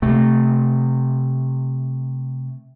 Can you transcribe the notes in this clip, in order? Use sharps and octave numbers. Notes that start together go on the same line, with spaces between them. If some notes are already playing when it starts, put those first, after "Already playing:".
C3 A3